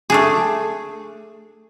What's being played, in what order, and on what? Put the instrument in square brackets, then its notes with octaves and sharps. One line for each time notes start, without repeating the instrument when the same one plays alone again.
[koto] A3 D4 G#4